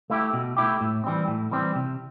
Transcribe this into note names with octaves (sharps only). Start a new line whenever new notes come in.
A3 E4 G4
B2
A3 E4 G4
A2
E3 G3 C4
A2
E3 G3 C4
C3